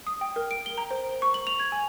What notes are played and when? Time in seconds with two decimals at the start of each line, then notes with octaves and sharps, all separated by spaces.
0.07 D#6
0.21 G5
0.36 A#4
0.51 D7
0.66 G7
0.78 A#5
0.91 C5
1.22 C#6
1.34 F#7
1.47 F7
1.60 G#6
1.72 G#5